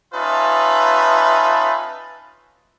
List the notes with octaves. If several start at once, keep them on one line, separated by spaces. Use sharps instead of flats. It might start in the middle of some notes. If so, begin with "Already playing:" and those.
C#4 D#4 F4 B4 E5 A5